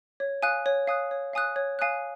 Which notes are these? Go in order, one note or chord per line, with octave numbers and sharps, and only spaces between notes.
C#5
F5 G#5 D#6 F#6
C#5
F5 G#5 D#6 F#6
C#5
F5 G#5 D#6 F#6
C#5
F5 G#5 D#6 F#6